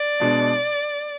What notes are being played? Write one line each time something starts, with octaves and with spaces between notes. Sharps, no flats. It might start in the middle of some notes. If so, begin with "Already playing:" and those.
Already playing: D5
B2 G#3 D4